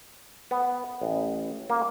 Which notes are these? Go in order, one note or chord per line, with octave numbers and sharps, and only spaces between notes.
B3
A1
A#3